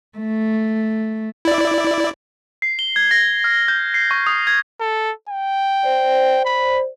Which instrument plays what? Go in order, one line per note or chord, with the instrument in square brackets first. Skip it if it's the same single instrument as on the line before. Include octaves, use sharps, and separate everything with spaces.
[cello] A3
[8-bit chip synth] E4 D5
[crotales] C7
G7
G#6
A#6
F6
G6
C7
C#6
D#6
G#6
[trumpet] A4
G5
[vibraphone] C5 D5
[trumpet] B5